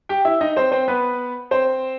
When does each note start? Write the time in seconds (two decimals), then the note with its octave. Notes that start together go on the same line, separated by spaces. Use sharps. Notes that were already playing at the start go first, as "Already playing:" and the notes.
0.09 G4 G5
0.25 E4 E5
0.41 D#4 D#5
0.56 C4 C5
0.72 C4 C5
0.88 B3 B4
1.51 C4 C5